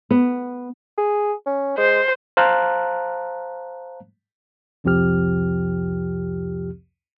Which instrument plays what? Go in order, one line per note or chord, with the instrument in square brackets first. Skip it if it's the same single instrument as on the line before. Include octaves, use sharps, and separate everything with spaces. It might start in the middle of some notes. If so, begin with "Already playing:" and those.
[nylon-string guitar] B3
[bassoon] G#4
C#4
[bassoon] G#3 [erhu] C5
[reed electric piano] C5 F5 A5 A#5 F#6
[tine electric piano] C2 F2 C3 F3 G4 F6